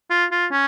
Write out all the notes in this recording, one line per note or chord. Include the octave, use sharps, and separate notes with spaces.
F4
F4
C#4